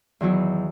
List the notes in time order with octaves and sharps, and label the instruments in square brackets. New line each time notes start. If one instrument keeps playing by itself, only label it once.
[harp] E2 D#3 F#3 B3 E4